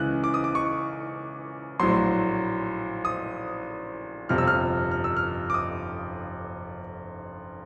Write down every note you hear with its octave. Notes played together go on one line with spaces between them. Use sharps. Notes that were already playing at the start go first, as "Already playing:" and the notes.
Already playing: C#2 C#3 E3 F#6
D6
D#6
D6
C#6
A#1 A2 F#3 C6
D#6
G1 F2 C3 F3 F6
E6
F6
F6
E6
F6
D6
D#6